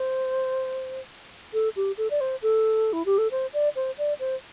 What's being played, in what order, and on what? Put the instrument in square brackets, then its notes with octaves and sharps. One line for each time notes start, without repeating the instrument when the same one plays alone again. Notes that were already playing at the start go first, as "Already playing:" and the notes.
Already playing: [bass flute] C5
A4
G4
A4
D5
C5
A4
E4
G4
A4
C5
D5
C5
D5
C5